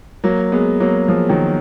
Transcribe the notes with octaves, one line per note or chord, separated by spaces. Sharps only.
F#3 A#3
G#3 B3
F#3 A#3
F3 G#3
D#3 F#3